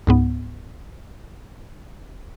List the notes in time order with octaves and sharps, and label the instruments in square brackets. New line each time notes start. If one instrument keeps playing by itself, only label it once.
[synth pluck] C#2 G#2 B3